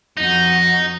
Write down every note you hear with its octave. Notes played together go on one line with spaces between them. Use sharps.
F2 D#4 F#4